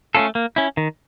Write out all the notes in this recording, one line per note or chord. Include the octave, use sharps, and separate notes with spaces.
A3 C#4 F4 A4
A#3
C#4 E4
D#3